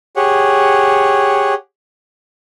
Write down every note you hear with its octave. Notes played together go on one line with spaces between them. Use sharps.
G4 G#4 C#5 F#5